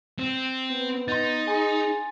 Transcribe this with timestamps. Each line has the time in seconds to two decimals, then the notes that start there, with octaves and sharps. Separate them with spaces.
0.19 C4
0.71 B3
1.08 D#4 C6 A6
1.48 G#4 G#5 C6